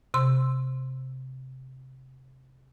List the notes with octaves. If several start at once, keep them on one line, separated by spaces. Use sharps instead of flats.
C3 C6